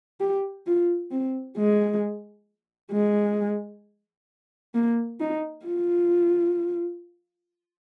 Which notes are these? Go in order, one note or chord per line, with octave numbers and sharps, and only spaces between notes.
G4
F4
C4
G#3
G#3
A#3
D#4
F4